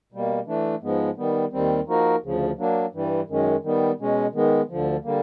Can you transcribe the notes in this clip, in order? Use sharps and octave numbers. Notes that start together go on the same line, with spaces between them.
B2 G3 A#3
E3 A3 D4
G#2 F3 G#3 B3
D#3 G3 B3
D#2 D#3 G3 C4
F3 A#3 D#4 F#4 A#4
D2 C#3 F3
F#3 A#3 D4
G2 E3 G3
F#2 D#3 G#3 C#4
D#3 G3 B3
B2 G#3 C#4
D#3 G#3 B3
D2 D3 F3
D3 G3 A#3